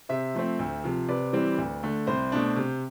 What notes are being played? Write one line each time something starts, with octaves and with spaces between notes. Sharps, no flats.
C3 C5 E5
F3 A3 C4
D2
C3 F3
C3 B4 D5
E3 G3 C4
D2
D3 A3
C2 C5
B2 A3 D4
C3